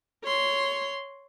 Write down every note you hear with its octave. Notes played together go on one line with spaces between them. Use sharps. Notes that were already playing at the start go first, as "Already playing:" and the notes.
C#5 C6